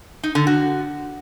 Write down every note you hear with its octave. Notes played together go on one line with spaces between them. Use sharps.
D#4
D3
F#4